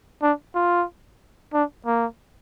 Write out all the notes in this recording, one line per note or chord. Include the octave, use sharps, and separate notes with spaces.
D4
F4
D4
A#3